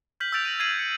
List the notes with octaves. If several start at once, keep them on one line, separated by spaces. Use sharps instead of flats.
F6 G6 B6 F#7
E6 F6 G6 A6 D7 F7
A#6 D#7
G#6 C7 D#7 F#7
C#7